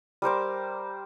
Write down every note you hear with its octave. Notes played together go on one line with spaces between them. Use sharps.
G3 A#4 C5 D6